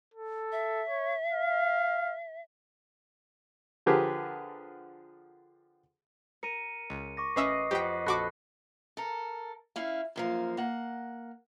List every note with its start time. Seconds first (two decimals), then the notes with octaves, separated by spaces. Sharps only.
0.14 A4
0.52 E5
0.89 C#5
1.33 F5
3.86 D3 F3 G4 G#4 A#4 B4
6.43 A#4 C#7 D#7
6.90 C#2
7.17 C#6 D6 A#6
7.36 A1 C#4 B4 D#5 E5 C7
7.71 F2 G4 F#5 G5 B6
8.06 A#1 F#4 A4 B5 D6 F#6 A#6
8.97 A4 A#4
9.76 C#4 E4 F5
10.16 F#2 F3 A#3
10.57 A#3 F#5